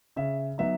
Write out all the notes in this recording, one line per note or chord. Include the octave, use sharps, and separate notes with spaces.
C#3 E5
F#3 B3 D#4 E5